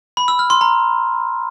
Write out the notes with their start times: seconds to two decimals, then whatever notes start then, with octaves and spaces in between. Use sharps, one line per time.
0.17 B5
0.28 E6
0.39 F6
0.50 C6
0.61 A#5